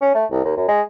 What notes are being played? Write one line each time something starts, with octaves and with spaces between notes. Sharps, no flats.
C#4
A3
C2
D#2
F#2
G#3